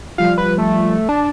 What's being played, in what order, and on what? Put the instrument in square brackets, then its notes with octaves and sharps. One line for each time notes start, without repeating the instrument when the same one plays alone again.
[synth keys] F3 G3 F4 [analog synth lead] F5
[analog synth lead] B4
A3
[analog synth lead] D4 [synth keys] A5